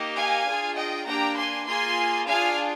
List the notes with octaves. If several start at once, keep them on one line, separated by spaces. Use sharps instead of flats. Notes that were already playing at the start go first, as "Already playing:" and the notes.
Already playing: A#3 D#4 G4
F5 G#5
D4 F4 G#4
D#5 G5
A#3 D4 G4 G5 A#5
G#5 C6
A#3 F4 G#4 G#5 C6
D4 F4 G#4 F5 G#5